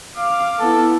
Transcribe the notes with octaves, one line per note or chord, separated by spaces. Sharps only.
F5 D6
B3 E4 A4